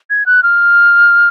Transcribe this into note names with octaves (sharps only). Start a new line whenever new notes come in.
G#6
F#6
F6